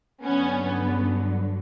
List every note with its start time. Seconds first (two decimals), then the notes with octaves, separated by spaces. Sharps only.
0.22 G2 D3 F#3 B3 C#4
0.62 B3